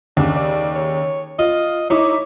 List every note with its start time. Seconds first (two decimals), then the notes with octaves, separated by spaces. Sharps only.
0.17 D#2 C#3 D4
0.36 D5
0.76 C#5
1.39 F4 D#5
1.90 D#4 E4 C#5 D6